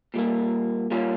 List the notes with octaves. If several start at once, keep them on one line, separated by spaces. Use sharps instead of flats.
A#2 G3 A#3
A#2 G3 A#3 C#4 F4